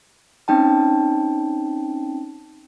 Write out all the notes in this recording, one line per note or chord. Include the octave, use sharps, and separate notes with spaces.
C4 C#4 D#4 G5 A5